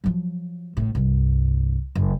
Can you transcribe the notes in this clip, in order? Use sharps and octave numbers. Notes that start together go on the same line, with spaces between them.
F3 F#3
A1 A2
C2 G2
F#1